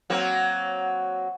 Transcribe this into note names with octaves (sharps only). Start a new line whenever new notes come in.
F#3 A#3 C4